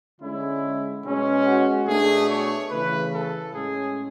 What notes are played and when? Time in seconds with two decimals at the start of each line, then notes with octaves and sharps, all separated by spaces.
0.21 D3 G#3 C#4 E4
1.05 B2 G#3 C#4
1.45 F#4
1.87 B2 A3 D4 G#4
2.29 C#5
2.71 C#3 E3 A3 B4
3.13 A4
3.53 A2 G#3 C#4 G#4